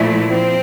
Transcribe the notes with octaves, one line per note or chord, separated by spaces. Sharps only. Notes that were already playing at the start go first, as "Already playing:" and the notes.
Already playing: A#2 F3 A3 E4
F3 C4